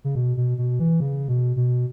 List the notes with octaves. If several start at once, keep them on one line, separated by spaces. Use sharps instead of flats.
C#3
B2
B2
B2
E3
C#3
B2
B2